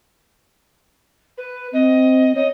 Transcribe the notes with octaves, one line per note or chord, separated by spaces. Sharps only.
B4
C4 D#5
C#5 D#5